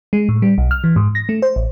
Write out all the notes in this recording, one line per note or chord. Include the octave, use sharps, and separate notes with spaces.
G#3
A2
G3
B1
F6
E3
G#2
A#6
A3
C5
A1